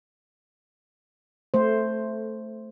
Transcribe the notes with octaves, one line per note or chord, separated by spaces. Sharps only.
A3 C5